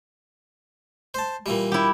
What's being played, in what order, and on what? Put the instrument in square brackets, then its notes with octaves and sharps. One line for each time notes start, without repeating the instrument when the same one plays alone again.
[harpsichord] C5 A5
A#2 E3 G3
[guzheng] E4 G4